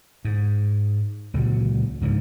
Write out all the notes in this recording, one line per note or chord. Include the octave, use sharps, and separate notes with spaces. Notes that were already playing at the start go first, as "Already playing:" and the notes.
G#2
C#2 A#2 D3 F#3
C#2 G#2 D3 F3